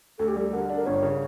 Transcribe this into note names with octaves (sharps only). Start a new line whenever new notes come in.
D2 A4
G4
G3 A4
D3 A#4
D4
A#4
G1 C#5
C#3